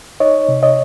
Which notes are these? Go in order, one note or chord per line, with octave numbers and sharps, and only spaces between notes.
D#4 C#5 D#5
C3
C#5 D#5